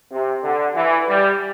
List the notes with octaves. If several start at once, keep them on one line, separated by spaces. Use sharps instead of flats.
C3
D3
E3
G3